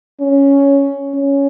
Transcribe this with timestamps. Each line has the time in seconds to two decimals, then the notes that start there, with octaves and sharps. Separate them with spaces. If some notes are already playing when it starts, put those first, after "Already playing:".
0.20 C#4
1.14 C#4